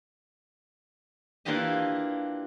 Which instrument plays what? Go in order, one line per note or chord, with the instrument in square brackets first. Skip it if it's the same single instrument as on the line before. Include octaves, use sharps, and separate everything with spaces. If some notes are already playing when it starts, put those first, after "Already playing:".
[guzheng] E3 A#3 D4 F4 G4 D#5